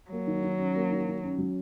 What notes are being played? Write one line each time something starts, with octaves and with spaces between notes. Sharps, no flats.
F#3 A#3
D#3
D#3
C#4
A#3
D#3
D#3
C#4
F#3